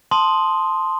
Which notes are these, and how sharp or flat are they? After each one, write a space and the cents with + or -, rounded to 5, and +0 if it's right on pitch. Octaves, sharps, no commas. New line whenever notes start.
A5 +0 C6 +0 D#6 +0